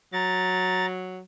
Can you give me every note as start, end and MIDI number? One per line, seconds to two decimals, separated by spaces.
0.13 1.20 54
0.13 0.86 82
0.13 0.86 93